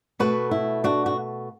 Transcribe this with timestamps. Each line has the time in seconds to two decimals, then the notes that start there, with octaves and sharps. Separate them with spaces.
0.19 B2 A3 F#4 B4
0.51 E4
0.84 D4 F#4
1.06 F#4